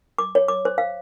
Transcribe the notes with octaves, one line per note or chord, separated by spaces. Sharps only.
D6
C#5
D6
C5
F5